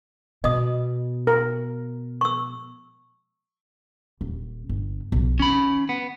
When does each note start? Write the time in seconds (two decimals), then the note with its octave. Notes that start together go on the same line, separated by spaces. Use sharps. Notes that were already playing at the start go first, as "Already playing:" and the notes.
0.44 B2 D#5 D#6
1.27 A#4
2.21 C#6 E6
4.21 D#1
4.69 G1
5.12 B1 F3
5.39 D#3 C#4 B5
5.89 B3